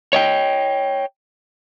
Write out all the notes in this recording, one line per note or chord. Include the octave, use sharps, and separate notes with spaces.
C#5 D#5 G5